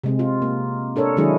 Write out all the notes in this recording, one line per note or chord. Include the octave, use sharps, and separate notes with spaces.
C3 G#3 C4
F4
A#3
D4 A4 A#4 C#5
D#3 F#3 G#3 D4 E4 G#4